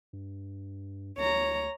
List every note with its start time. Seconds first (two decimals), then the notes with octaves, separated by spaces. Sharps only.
0.13 G2
1.17 D2 C#5 A#5